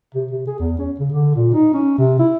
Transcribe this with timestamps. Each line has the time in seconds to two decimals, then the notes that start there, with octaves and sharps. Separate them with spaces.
0.14 C3
0.31 C3
0.47 G#4
0.59 E2
0.78 C#4
1.00 C#3
1.12 D3
1.35 A#2
1.54 D#4
1.74 C#4
1.98 C3
2.19 E4